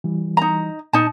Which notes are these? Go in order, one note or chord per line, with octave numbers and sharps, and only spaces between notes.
E3 G3
D#4 A#5
A#2 D#4 A5